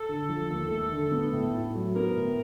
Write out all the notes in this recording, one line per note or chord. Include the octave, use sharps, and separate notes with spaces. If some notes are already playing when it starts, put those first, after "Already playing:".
Already playing: A4
D3
F3
D#2
A3
D3
B3
A2
E4
F#3
B3 A#4
A2